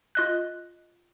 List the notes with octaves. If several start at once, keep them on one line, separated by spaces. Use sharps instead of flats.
F4 D#5 F#6